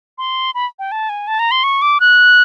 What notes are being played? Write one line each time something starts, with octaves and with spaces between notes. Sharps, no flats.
C6
B5
G5
A5
G#5
A5
A#5
C6
C#6
D6
F#6